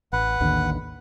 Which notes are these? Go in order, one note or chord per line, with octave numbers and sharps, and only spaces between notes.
A1 B4 F#5
A1 D#2 D3